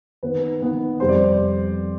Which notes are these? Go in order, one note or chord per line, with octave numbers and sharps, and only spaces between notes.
D#3 B3 D#4 B4
D#3 B3 D#4
F2 C3 G3 C5
D5